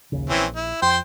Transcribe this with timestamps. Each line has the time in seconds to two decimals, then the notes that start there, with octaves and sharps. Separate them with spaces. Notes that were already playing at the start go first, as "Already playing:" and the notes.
0.12 A#1 D#2 C#3
0.30 A#1 E3 C4 C#4
0.56 E4
0.82 F2 C5 G5